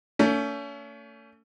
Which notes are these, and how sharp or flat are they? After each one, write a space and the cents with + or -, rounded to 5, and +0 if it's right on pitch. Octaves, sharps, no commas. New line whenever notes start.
A3 +40 C#4 +40